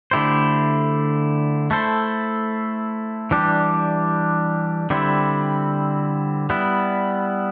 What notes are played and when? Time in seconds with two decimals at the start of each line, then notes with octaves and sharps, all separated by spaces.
0.11 D3 A3 E4 G4 C5
1.71 A3 E4 A4 C5
3.31 E3 G3 D4 G4
4.90 D3 G3 C4 E4
6.50 G3 B3 E4